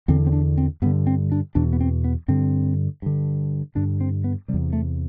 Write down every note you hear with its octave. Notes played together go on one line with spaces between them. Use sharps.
E2 D3 C4
C4
D4
C4
G2 D3 B3
C4
D4
E2 B2 D4
B3
C4
B3
G2 D3 C4
G2 D3
G2 D3 D4
C4
B3
C3 G3
E2
A3